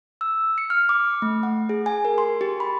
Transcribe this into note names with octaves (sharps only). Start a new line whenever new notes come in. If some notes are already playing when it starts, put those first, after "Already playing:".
E6
C#7
F6
D6
A3
F#5
G#4
G#5
A#4
C6
G4
B5